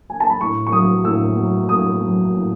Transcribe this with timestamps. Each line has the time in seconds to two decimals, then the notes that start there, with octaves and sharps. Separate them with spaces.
0.10 G#5
0.20 A5
0.29 B5
0.41 A2 C#6
0.67 C#6
0.72 F#3 D#6
1.04 A2 E6
1.37 F#3
1.68 A2 D#6
2.01 F#3
2.33 A2